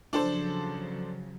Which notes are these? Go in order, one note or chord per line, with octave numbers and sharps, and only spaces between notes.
C#3 F3 F#3 D4 A4 C5